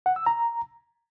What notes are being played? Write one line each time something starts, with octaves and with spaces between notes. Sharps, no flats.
F#5
E6
A#5